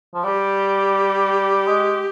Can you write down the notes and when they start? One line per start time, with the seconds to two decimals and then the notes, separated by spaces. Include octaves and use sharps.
0.14 F3
0.24 G3 G4
1.68 G#3